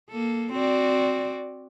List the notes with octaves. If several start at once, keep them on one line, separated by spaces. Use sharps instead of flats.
A#3 A4
C4 F#4 D5